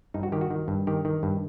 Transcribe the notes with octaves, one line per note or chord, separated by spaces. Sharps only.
G2 D#4
F#4
D#3 G4
F#4
D#3
G2
D#3 G4
D#3
G2